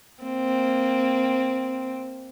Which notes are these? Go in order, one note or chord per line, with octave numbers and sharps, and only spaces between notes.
A#3 C4